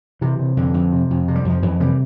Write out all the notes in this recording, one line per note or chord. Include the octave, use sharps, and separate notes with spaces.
C3 E3
C3
F2 D3
F2
C3
F2
C3
G3
F2 F3
F2 E3
C3 E3 G3